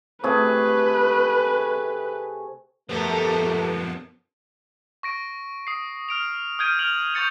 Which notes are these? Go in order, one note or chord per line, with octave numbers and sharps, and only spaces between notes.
C3 A3 G#4 B4
F#2 F3 A3 B3 G4 A4 A#4
C#6 A#6 D7
D#6 C7
F6 D7 F7
D#6 F6 G6 G#6 D7 D#7
F6 D7 F7 F#7
C#6 D#6 G6 A6 C#7 F7